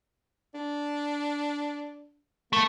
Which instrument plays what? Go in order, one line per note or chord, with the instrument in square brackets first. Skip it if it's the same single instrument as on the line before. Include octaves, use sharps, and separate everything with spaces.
[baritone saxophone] D4
[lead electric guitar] A3 [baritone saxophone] A#3